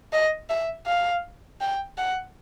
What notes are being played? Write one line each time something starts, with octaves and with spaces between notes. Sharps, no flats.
D#5
E5
F5
G5
F#5